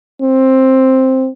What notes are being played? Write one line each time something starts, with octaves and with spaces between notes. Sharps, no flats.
C4